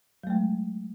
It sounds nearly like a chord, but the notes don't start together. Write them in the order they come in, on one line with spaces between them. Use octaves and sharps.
F#3 A3 G#3